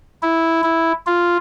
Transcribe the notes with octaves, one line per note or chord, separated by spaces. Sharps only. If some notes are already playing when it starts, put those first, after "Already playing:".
E4
E4
F4